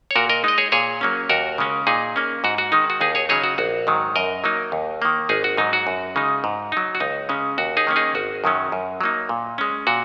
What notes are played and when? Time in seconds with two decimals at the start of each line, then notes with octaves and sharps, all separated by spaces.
0.11 C#5
0.16 A#2 F#4 A#4
0.29 A#4 D#5
0.44 G#3 D#4 D#5
0.58 G#4 C#5
0.72 A#2 G#4 C#5
1.01 F#3 A#3 C#4
1.30 D#2 F#4 A#4
1.58 C#3 G#3 C#4
1.87 A#2 D#4 G#4
2.16 A#3 C#4
2.44 G#2 F#4
2.58 F#4
2.72 D#3 G#3 D#4
2.90 F#4
3.01 D#2 D#4 G#4
3.15 G#4 C#5
3.29 C#3 F#3 D#4 G#4 C#5
3.44 F#4
3.58 A#1 F#4
3.87 G#2 D#3 F#3
4.16 F#2 A#4 D#5
4.44 F#3 A#3 D#4
4.72 D#2
5.02 D#3 A#3
5.29 G#1 D#4 G#4
5.44 F#4
5.57 G#2 F#3 D#4
5.73 F#4
5.87 F#2
6.16 C#3 G#3 D#4
6.44 G#2
6.72 F#3 D#4
6.95 F#4
7.00 C#2 D#4
7.29 C#3 G#3 C#4
7.58 D#2 F#4
7.77 D#4 G#4
7.87 D#3 A#3 C#4
7.96 D#4 G#4
8.15 G#1 F#4
8.44 F#2 D#3 F#3 C#4
8.72 F#2
9.01 F#3 A#3 D#4
9.29 A#2
9.58 G#3 C#4
9.87 A#2 F#4